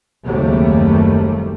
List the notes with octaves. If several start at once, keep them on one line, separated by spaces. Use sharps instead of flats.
F#1 D#2 C3 G3 A3